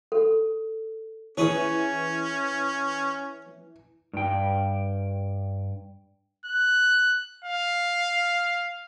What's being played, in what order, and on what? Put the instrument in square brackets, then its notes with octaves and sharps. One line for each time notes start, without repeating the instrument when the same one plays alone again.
[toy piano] A4
[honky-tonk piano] E3 [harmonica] C#4 [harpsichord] G#4 B4 C#5
[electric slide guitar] G2 G5
[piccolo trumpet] F#6
F5